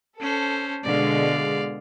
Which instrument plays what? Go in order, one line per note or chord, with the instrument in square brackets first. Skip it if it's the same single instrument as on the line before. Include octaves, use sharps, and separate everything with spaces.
[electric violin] C#4 C5 [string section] A4
[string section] B2 D3 G#3 [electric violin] D5 F5